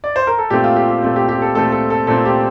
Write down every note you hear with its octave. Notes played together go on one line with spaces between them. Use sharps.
D5
C5
A#4
A4
A#2 A3 C4 G4
F4
G4
G4
A#2 A3 C4
G4
G4
A4
A#2 A3 C4 A4
A4
A4
A#2 A3 C4 A4
G4